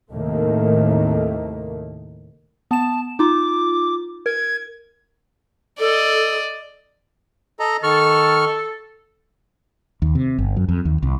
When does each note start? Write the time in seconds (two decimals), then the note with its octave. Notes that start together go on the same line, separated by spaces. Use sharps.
0.11 D#2 A2 C3 D#3 A3 A#3
2.71 B3 A5 E7
3.19 D#4 F4 D6
4.26 A#4 G#6
5.79 A4 D5 D#5
7.60 A4 D#5 A#5
7.83 D#3 A4 C#6 F6
10.02 D#2
10.15 C3
10.38 G1
10.56 F#2
10.69 F2
10.85 D#2
11.03 C2